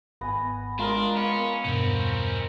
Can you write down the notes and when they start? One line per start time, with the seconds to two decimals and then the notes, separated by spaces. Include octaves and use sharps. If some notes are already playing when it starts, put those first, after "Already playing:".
0.21 G#1 B3 G#5 A#6
0.79 G#3 D4 F4 A#4 D#5
1.16 B3 C#4 A#4 F5
1.65 E2 G2 B2 C4 C#4